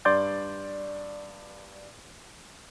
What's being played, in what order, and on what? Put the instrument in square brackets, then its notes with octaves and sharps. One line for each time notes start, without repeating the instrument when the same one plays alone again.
[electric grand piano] G2 D5 C6 D6 G6 A6